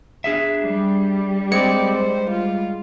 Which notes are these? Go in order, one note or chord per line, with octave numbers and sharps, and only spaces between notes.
D4 G#4 E5
G3
G#3 C4 D5 C#7
C5
F4